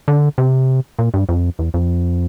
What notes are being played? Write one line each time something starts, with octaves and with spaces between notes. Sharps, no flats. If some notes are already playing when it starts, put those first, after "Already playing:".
D3
C3
A#2
G2
F2
E2
F2